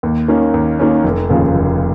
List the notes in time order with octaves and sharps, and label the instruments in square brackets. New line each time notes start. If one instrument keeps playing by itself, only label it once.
[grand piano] D#2
D#3 A#3 C#4
D#2
D#3 A#3 C#4
F1
D#2 C#3 F3 A#3
F1